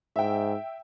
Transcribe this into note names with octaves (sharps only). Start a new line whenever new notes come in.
G#2 E5 G5